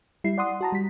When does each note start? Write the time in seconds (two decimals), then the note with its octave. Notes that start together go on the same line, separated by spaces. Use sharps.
0.24 G3 E4 C7
0.38 D5 F#5 C6 D#6
0.61 F#4 A5 A#5
0.72 G3 B6